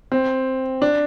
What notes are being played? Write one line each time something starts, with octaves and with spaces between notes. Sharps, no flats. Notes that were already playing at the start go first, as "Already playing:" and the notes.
C4
D4